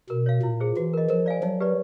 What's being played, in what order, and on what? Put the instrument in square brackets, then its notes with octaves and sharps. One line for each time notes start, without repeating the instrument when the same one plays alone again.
[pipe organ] B2 [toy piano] A#4
[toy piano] C#5 F5
[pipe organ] A#2 [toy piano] E4
[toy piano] G#4 C5
[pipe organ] E3 [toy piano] F#4
[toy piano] A#4 D#5
[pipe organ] F3 [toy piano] A#4
[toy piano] D5 F5 G#5
[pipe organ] F#3 [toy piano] D#4
[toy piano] G4 B4 D5